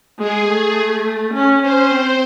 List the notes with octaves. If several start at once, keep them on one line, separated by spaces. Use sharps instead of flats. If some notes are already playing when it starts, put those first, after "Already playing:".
G#3 G#4
A3
C#4
C#4 C5
C4